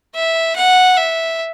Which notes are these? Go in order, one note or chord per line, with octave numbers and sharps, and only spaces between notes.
E5
F#5
E5